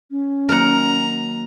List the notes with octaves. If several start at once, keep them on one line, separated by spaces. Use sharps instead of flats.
C#4
D#3 F#3 A#3 A#4 F#5 A#5